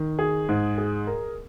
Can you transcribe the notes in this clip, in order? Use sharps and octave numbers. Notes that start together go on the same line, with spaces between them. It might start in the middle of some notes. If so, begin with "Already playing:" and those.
Already playing: D#3
G#4
G#2
G#4
A#4